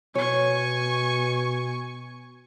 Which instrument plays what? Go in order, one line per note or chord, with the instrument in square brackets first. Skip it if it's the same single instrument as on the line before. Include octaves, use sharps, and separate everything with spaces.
[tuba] B2 [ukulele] C#5 [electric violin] G#5 C#6